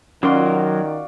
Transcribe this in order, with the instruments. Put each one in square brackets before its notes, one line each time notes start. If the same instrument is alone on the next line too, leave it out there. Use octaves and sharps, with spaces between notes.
[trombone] D#3 [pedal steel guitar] F#3 A#4 C6 [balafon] C#4 [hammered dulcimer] F4 F#4 D5